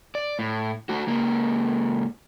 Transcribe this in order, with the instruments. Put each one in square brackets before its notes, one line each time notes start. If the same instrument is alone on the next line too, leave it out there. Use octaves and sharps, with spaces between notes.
[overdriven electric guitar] D5
A2
A3 F#4
C#2 A#3